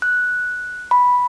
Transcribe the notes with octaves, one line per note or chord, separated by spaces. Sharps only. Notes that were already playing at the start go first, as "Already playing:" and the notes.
F#6
B5